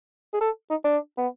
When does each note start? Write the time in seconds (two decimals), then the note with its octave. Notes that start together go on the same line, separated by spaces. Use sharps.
0.34 G#4
0.41 A4
0.70 D#4
0.84 D4
1.18 B3